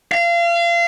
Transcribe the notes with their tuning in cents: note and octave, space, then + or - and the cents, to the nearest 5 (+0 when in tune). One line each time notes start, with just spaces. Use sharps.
F5 -30